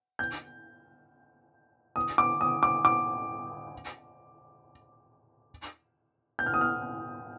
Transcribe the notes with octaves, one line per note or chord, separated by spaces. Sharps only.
G6
D#6
D6
D#6
D6
D6
G6
F6
D#6
F6